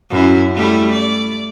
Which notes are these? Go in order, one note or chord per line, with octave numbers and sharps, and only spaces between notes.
F#2 E4
G3 A3 E4
D5